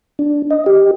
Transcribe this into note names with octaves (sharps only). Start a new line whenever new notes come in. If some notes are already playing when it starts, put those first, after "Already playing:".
D4
D#5
G4